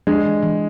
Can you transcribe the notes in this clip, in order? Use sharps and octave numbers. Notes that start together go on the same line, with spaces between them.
G#3 D4
E3
E3